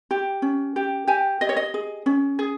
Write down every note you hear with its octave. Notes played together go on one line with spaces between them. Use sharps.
G4
C#4
G4
G4 G#5
G4 D#5
C#5
D#5
G#4
C#4
G#4